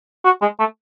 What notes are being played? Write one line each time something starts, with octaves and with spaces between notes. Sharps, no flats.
F#4
G#3
A3